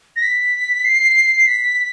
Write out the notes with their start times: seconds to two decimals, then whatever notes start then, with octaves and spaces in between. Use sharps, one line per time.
0.16 A#6
0.22 B6
0.85 C7
1.47 B6